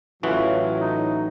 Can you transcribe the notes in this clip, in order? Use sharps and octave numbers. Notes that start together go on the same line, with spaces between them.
A1 A2 E3 F#3 F4 F#4
D#4